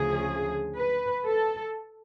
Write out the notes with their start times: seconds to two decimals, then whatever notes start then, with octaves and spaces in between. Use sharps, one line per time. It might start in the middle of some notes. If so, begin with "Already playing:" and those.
Already playing: D2 C#3 F3 G#4
0.76 B4
1.26 A4